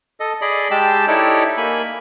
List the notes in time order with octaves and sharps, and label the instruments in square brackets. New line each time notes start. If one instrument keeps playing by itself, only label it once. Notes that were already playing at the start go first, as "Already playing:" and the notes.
[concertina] A4 D#5
G#4 D5 D#5 B5
G#3 G4 G5 A5 E6
D#4 E4 G4 A4 C#5 D5
A#3 G#5 B5